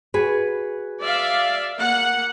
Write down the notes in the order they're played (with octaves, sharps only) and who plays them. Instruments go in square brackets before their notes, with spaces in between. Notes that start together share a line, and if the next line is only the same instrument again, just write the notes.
[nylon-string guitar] F#4 G#4 B4
[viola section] D5 E5 F5
A#3 F#5